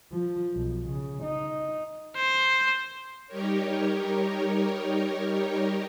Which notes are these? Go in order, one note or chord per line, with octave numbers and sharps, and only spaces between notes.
F3
B1
C#3
D#4
C5
G3 D#4 G4 A#4 C#5